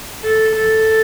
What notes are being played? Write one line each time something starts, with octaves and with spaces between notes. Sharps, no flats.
A4
A4